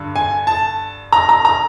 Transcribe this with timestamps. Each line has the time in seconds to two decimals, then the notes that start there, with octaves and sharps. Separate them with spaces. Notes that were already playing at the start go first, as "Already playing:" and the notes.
Already playing: G2 D3
0.16 G#5
0.47 A5
1.13 A#5
1.29 A#5
1.45 A#5